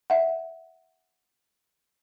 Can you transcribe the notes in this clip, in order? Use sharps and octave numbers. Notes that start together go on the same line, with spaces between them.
E5 F#5